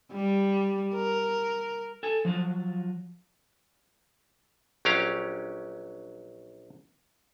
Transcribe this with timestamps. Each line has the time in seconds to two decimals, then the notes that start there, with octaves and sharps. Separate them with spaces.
0.13 G3
0.95 A#4
2.03 A4 G#5
2.25 F3 F#3 F4
4.85 A#1 F#3 C#4 G4 F5 A#5